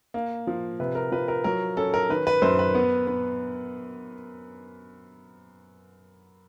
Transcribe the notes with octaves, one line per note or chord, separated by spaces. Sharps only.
A#3
F3
C3 B4
A#4
F3 B4
A#4
F#3 A#4
C#4 A4
A#4
D#3 B4
B4
F#2 C5
B4
B3
B3